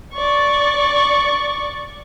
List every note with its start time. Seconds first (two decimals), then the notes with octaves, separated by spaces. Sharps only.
0.14 D5 C#6